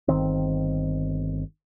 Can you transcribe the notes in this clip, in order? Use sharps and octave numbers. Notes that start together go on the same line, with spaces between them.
G1 C2 D#3 C4